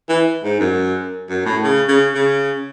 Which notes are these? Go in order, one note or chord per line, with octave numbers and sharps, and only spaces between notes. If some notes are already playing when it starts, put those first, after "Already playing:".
E3
G#2
F#2
F#2
A2
C#3
C#3
C#3